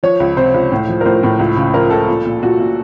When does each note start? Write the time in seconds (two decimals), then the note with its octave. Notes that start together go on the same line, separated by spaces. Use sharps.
0.03 F3 C#5
0.20 C#2
0.37 C3 C5
0.54 C#2
0.72 A2
0.88 F3
1.01 A#4
1.05 A2 C5
1.23 A2
1.39 C#2
1.56 C#3
1.74 F3 A#4
1.90 C#2 A4
2.08 A#2
2.25 A#2
2.42 A#2 F#4
2.60 A#2